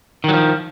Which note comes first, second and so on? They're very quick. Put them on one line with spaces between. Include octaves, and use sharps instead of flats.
D#3 F#3 F3